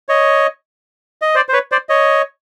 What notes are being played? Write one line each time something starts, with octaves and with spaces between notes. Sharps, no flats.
C#5 D#5
D#5
C5 D5
C5
B4 C#5
C5 D5
C#5 D#5